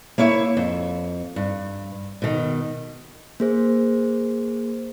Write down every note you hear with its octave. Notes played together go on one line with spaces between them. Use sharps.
A#3 E4 C#5 E5
F2
G2
B2 D#3
A#3 G#4 C5